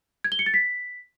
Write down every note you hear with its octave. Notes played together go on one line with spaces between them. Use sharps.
G#6
G7
C#7
A6
B6